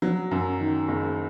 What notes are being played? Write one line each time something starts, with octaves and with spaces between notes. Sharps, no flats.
F#3
F#2
D#3
F#1